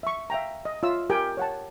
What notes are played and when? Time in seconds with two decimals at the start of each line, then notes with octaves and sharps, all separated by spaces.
0.03 E5 C#6
0.30 E5 F5 G5 A#5
0.65 D#5
0.83 F4 C#5 E5 E6
1.10 G4 A#4 G5 G#5
1.37 C#5 F#5 A5